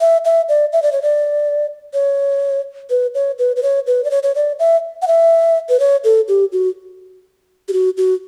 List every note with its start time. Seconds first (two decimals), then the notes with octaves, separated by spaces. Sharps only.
0.01 E5
0.25 E5
0.49 D5
0.73 E5
0.82 D5
0.92 C#5
1.02 D5
1.94 C#5
2.90 B4
3.15 C#5
3.38 B4
3.56 B4
3.63 C#5
3.87 B4
4.04 D5
4.11 C#5
4.23 C#5
4.35 D5
4.59 E5
5.02 F#5
5.08 E5
5.69 B4
5.80 C#5
6.04 A4
6.28 G4
6.52 F#4
7.68 G4
7.73 F#4
7.97 F#4